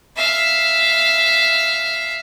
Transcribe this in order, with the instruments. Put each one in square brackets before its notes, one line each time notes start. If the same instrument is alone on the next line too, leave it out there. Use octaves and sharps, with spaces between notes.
[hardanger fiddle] E5 F5